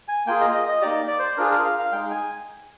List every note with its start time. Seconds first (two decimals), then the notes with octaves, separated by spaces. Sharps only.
0.08 G#5
0.27 A#3 F4 G#4 G5
0.41 D#5
0.54 D#5
0.68 D#5
0.82 A#3 D#4 G4 D5
1.08 D5
1.19 C5
1.37 D4 F4 G#4 A#4
1.51 A#4
1.65 F5
1.79 F5
1.92 G#3 D#4 G#4 G5
2.11 G#5